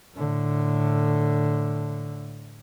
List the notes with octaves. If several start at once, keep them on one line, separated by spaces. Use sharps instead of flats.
A2 D3